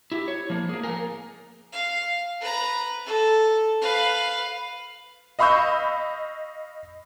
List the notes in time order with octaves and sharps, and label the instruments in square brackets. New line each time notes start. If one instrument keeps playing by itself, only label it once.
[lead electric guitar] E4 G4
C#5
F3 A#3
A#3 G#4
A#4 G#5
[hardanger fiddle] F5
B4 A#5
A4
B4 F5
[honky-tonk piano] D#5 F5 B5 C#6 E6 G6